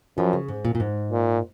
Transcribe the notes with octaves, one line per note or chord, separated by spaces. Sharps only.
F#2 F3
C#3
G#2
A#2
A#2
G#2
A#2